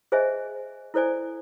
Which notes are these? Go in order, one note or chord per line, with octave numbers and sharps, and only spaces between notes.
G#4 C5 D#5 E5 G#5
E4 A4 C5 D5 G#5